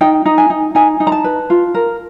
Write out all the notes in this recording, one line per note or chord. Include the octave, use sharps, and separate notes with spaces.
D#4 G5
D#4
G#5
D#4
D#4 G#5
D#4
A#5
A5
B4
F4
A#4